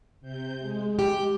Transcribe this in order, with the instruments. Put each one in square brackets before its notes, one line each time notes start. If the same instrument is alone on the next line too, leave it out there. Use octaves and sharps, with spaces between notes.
[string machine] C3 G6
G#3
[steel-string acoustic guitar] G4